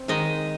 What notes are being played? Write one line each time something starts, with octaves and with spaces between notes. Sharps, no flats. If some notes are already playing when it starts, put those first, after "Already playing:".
Already playing: C4
D#3 G#3 D#4 D#5